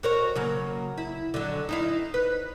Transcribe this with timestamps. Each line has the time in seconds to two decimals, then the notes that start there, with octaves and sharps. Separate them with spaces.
0.03 F#4 A#4 C#5
0.35 C#3 F#3 A#3
0.98 E4
1.34 D3 F#3
1.69 D#4 E4 F5
2.14 B4